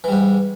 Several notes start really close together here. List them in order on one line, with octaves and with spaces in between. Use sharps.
E3 G3 G#2